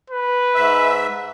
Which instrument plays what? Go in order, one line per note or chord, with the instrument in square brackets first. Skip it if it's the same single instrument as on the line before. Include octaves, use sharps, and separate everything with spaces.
[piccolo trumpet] B4
[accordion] G#2 E5